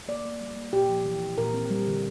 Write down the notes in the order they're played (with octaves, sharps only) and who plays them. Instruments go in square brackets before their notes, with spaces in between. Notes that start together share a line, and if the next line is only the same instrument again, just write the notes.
[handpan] A#3 D5
A#3
G3
A#3
A#2 G4
F3
E3
C4
A#2 A#4
C4
G3
D3